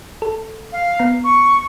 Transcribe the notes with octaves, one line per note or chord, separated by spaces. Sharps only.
A4
F5
B3 A#5
C#6